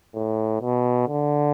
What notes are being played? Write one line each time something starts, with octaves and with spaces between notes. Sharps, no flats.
A2
B2
D3